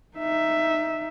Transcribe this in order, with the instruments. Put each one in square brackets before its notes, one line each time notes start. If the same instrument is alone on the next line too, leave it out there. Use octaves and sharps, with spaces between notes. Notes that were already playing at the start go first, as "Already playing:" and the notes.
[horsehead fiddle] D#4 E5